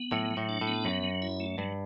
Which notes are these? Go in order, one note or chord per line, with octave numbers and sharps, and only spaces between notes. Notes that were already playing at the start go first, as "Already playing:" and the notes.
Already playing: B3
A2 F#3
F#3
A2
D4
A2
B3
F#2 F#3
F#3
E4
A3
G2 F#3